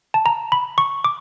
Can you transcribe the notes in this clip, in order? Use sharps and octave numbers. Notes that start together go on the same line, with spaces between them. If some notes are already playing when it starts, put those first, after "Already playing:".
A5
A#5
B5
C#6
D6